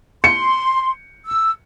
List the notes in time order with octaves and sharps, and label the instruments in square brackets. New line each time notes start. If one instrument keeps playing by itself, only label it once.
[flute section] C6 [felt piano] C#7
[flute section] E6